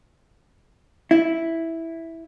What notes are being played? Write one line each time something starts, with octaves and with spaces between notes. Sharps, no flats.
E4